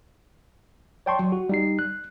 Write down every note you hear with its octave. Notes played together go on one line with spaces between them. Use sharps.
C#5 D5 G5 A5 C6 C#6
F#3
F#4
G3 D#4 C7
F#6